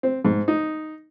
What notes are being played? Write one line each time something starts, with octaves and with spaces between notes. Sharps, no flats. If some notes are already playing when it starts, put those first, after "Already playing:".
C4
G#2
D#4